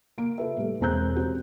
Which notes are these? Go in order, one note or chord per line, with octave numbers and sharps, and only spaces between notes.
A#3 D7
F4 A4 B4 E5
A2 G3
E1 G#3 C4 A#5 F#6 G6
C4 C#4 F#4 G4